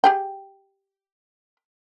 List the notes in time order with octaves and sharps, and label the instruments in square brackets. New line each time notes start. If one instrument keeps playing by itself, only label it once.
[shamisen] G4 G#4 G5